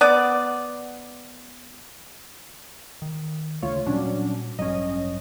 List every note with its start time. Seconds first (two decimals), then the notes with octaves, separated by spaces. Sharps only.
0.01 B3 D5
3.02 D#3
3.62 D2 C#3 A3 F4 C#5
3.86 A#2 F#3 G3 C#4 D4
4.59 A1 G2 F#3 C#4 D#5